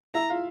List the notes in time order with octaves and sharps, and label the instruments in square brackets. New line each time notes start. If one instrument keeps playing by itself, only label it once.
[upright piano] E4 E5 [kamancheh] A#5
[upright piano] F4 F5